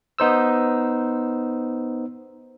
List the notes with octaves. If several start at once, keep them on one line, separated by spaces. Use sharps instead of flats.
B3 D#4 C5 E6